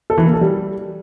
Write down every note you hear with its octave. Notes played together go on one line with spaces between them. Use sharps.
A4
E3
A#3
A4
G3